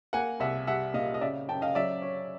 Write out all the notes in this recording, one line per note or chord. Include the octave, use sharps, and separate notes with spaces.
A#3 F#5 G#5
C2 E5 F#5
G3 E5 F#5
A#2 D#5 F5
D#5
C#3 D5 E5
F#2 G5 A5
D#5 F5
F#3 D5 E5
C#4